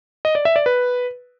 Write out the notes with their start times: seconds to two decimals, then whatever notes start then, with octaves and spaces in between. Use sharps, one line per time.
0.25 D#5
0.35 D5
0.45 E5
0.56 D5
0.66 B4